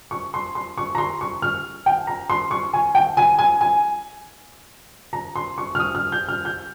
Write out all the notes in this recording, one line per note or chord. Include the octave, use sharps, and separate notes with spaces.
C#6
C6
C6
C#6
A#5
C6
C#6
F6
G5
A#5
C6
C#6
G#5
G5
G#5
G#5
G#5
A#5
C6
C#6
F6
D#6
F6
G6
F6
G6